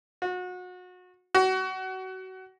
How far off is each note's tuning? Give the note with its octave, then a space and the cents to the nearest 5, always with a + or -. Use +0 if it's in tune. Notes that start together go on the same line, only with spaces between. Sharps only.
F#4 -30
F#4 +25